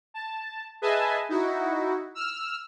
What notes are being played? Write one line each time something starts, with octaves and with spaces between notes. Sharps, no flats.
A5
G#4 B4 D#5 E5 G#5 A5
D#4 E4 F#4
E6 F6